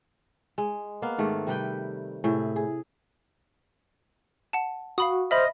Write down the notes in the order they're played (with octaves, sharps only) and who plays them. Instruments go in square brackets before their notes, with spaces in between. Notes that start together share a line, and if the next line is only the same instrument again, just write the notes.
[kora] G#3
A#3 B3 F5
G#2 D#3 A3
C3 G3 B4 G5
A2 C3 G#4 E5
G#4
[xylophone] F#5 A5
[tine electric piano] F#4 [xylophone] F5 B5 D#6
[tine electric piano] C5 F6 [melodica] D#5 [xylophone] E5 B5